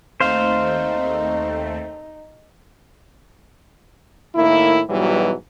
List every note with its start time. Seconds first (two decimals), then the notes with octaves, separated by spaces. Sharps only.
0.20 D#2 A3 C4 D#4 C5 F5
4.34 A2 D#3 A#3 E4
4.88 G#2 B2 E3 F#3 G3